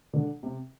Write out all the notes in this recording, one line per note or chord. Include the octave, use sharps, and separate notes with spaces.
D3
C3